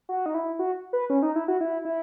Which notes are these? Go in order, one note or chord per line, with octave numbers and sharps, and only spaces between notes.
F#4
D#4
E4
F#4
B4
C#4
D#4
E4
F#4
E4
E4